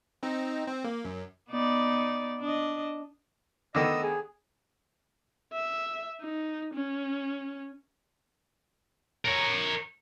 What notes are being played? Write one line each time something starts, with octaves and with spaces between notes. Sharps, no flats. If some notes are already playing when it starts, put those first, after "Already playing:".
C4 D#4
C4
A#3
F#2
B3 D#4 D5
D4 D#5
D3 D#3 B3 D#5 D#6 E6
G#4
E5
D#4
C#4
A#4 C#5